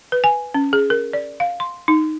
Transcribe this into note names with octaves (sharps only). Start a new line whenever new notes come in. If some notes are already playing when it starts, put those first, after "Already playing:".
B4
G#5
C#4
G#4
A#4
D5
F5
C6
D#4